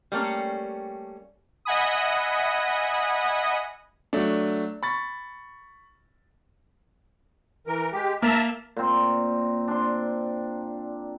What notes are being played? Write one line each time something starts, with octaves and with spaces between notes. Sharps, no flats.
G3 A3 A#3 C#4
D#5 E5 F#5 G#5 B5 D#6
F#3 A3 D4
B5 C#6 A6
E3 A#4
G#3 G4
A#3 E5 A5 A#5
A#2 C4
D4 C6